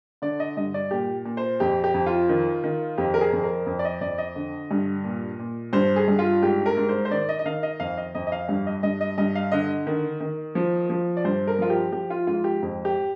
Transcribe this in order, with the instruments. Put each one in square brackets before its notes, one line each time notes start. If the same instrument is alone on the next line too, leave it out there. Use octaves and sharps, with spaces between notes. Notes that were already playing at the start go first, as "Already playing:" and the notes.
[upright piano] D3 D5
D#5
G2 D#5
D5
A#2 G4
A#2
C5
F2 G4
G4
F2
F4
D#3
D#3
F2 G4
A#4
G#4
F2
A#4
F2
D5
D#5
F2 D5
D#5
D3
G2
A#2
A#2
G2 C5
G#4
G2
F4
G#2 G4
A#4
G#2
C5
C5
D#3 D5
D#5
D#5
D#3 F5
D#5
F2 F5
D#5
F2 D#5
D#5
F5
G2 F5
D#5
G2 D#5
D#5
G2 D#5
F5
D3 D#5
D#3
D#3
F3
F3
D5
G2 C5
A#4
F3 F4
G4
F3 G4
F4
G#2 F4
G4
F2
G4